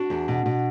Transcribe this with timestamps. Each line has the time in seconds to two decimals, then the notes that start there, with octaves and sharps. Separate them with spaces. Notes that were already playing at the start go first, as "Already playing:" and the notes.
Already playing: D4 F#4
0.10 E2
0.28 B2
0.46 B2